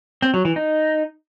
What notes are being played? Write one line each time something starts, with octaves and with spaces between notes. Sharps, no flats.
C4
F#3
E3
D#4